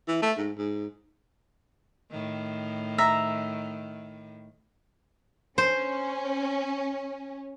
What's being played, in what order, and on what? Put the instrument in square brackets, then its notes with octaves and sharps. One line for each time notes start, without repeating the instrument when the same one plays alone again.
[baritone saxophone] E3
A3
G#2
G#2
[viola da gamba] A2 D#3
[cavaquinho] E5 A#5
[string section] C#4 [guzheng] C5